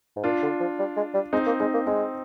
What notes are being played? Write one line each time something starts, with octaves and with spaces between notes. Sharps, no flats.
G#2
A#2 D4 F4
D3
F3
G3
G#3
G3
G#3 C4 D#4
A#3
G#3 C4 D#4
A#3
G#3 C4 D#4